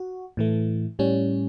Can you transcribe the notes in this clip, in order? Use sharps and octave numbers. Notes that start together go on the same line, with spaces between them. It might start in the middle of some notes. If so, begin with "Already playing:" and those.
Already playing: F#4
A2 E3 A3
A2 G3 C#4